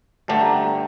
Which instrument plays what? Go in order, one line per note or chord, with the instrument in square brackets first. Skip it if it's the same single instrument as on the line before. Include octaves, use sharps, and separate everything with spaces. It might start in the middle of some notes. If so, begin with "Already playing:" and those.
[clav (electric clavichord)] G2 D3 A3 D4 G4 [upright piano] A5
[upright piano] A#5
G5